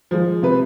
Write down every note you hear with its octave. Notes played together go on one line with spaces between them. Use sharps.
F3 G#3
C3 B4